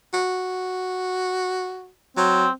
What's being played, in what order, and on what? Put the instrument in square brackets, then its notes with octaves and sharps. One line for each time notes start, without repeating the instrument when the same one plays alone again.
[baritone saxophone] F#4
[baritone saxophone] F#3 [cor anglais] C4